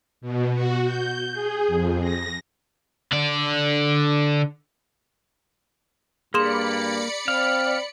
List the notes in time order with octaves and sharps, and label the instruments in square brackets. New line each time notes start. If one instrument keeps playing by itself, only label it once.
[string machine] B2
F#4
G6
G#4
F2
A#6
[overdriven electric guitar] D3 D5
[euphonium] G2 [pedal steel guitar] A#3 [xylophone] G#4 C6 E7 [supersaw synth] D5 B5 C#7
[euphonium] C4 [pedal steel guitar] F5